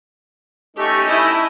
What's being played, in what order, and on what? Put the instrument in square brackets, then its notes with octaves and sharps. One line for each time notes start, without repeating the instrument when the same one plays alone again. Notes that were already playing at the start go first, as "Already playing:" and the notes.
[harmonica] A3 C#4 D#4 [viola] G4 C#6
[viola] E4 D#5